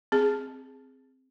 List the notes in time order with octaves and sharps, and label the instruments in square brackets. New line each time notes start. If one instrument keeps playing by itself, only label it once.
[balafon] C4 G#4